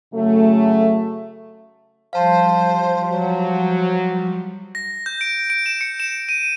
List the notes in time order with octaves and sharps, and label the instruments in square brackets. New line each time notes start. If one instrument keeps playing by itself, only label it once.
[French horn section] C#3 F#3 A3
[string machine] F3 G3 [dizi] C5 [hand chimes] F5 A5
[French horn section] F#3 [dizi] C5
[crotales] A#6
G6
D7
D7
E7
C#7
E7
D#7